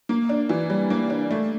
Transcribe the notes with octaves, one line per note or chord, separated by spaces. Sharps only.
A#3
D4
E3
G3
A#3
D4
A3